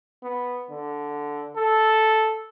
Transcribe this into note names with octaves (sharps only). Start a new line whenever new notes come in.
B3
D3
A4